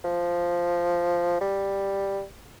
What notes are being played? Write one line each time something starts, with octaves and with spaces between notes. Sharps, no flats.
F3
G3